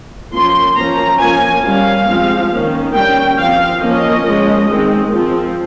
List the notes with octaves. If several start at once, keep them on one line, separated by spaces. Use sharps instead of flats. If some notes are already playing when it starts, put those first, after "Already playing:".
F3 A#3 C#4 C6
F3 A#3 C#4 A#5
F3 A#3 C#4 G#5
G3 C#4 F5
F3 G#3 C4
D#3 A#3 C#4
G3 C#4 G5
F3 C4 F5
F3 A#3 C#4 D#5
F3 G#3 C#4
D#3 G#3 C4
F3 C4